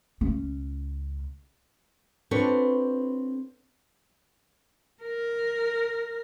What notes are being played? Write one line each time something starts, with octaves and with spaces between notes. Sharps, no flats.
C#2 C#4
C4 D4 F4 A4 B4 C#5
A#4